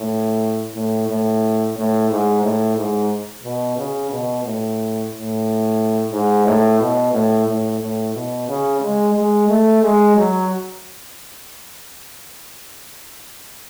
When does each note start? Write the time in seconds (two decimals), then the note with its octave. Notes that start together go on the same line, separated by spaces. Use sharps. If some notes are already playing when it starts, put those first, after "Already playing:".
Already playing: A2
0.74 A2
1.08 A2
1.76 A2
2.09 G#2
2.42 A2
2.76 G#2
3.43 B2
3.77 C#3
4.11 B2
4.44 A2
5.12 A2
6.12 G#2
6.47 A2
6.80 B2
7.13 A2
7.46 A2
7.80 A2
8.14 B2
8.48 C#3
8.81 G#3
9.14 G#3
9.49 A3
9.82 G#3
10.16 F#3